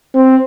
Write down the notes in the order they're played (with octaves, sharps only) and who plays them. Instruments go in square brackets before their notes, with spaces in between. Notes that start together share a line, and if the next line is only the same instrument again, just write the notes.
[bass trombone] C4